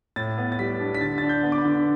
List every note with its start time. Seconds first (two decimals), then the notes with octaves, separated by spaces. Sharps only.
0.16 A2 A6
0.38 B3
0.52 A6
0.59 G3 B6
0.80 D4
0.94 B6
1.01 D3 A6
1.18 D4 A6
1.29 G6
1.43 B3
1.52 D6
1.58 B5
1.65 D3